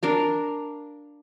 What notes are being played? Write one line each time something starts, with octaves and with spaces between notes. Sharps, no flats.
D4 A#4 F5